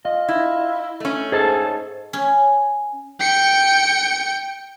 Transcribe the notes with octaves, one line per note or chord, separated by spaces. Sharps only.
F4 D#5
E4
A3 C#4
G#2 G#4 A4 A5
C#4
G5 C#7